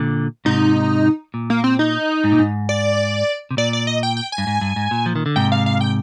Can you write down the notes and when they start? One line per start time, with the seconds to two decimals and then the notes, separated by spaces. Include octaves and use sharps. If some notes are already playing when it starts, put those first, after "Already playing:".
Already playing: A#2 D3
0.45 G#2 C3 D#4
1.34 A#2
1.50 A#3
1.64 C4
1.79 D#4
2.24 G#2
2.32 A#2
2.39 G#2
2.69 D5
3.51 C3
3.57 A#2 D5
3.73 D5
3.87 D#5
4.03 G5
4.17 G5
4.32 G#5
4.38 G2
4.47 G#2
4.61 G2
4.76 G#2
4.91 A#2
5.06 F3
5.16 D#3
5.26 D3
5.36 G#2 C3 G5
5.52 F5
5.66 F5
5.81 G5